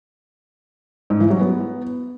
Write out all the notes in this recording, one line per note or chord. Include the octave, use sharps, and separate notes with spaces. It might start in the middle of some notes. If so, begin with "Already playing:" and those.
G#2
E3
F#3
B3